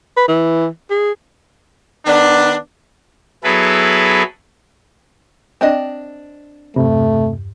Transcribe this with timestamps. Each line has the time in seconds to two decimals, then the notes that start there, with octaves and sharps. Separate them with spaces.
0.17 B4
0.28 E3
0.90 G#4
2.06 D#3 B3 D4
3.44 F#3 B3 E4 G#4 A4 B4
5.61 C4 D4 D#5
6.76 E2 G2 C3 A3